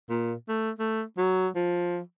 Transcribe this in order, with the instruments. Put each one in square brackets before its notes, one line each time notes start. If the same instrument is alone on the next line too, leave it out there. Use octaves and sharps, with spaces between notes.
[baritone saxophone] A#2
A3
A3
F#3
F3